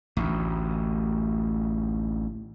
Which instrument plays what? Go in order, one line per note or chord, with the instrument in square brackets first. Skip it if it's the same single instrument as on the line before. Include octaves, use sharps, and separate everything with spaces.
[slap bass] A1 D2